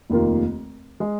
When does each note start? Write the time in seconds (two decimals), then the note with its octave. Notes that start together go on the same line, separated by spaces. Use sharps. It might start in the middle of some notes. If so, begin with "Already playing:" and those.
0.10 F1 D#2 D#3 A#3 F4
1.00 G#3